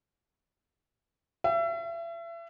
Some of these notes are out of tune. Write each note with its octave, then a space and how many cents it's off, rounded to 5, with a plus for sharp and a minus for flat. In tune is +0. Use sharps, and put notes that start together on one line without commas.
E5 +35